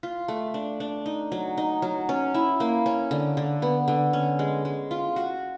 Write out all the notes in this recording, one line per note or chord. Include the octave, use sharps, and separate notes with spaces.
F4
A3
D4
D4
D#4
F#3
D#4
F#3
C#4
E4
A#3
C#4
D3
D3
B3
D3
C#4
G#3
G#3
F4
F#4